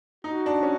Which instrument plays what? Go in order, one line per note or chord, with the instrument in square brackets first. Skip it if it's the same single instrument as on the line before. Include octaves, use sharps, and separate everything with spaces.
[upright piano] D#4 [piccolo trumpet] F#4
[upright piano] D4
C#4